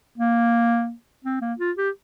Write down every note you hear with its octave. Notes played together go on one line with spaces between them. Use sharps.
A#3
C4
A#3
F4
G4